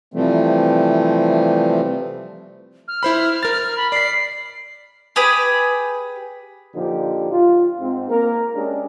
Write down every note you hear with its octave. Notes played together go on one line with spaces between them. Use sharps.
C3 E3 F3 G3 A3 C4
F6
E4 C5 B5
A#4 A6
B5
D5 B6 C7
G4 G#4 B4
A#2 D3 F3 D#4 G4
F4
G#2 C4
A#3 A#4
G#3 C#4 D4 G4 G#4